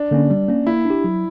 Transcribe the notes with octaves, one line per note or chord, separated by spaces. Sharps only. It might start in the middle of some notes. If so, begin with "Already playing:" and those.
Already playing: D4
D3 A#3 C#4
G3
A#3 C#4
A#3 E4
D4 G4
F#3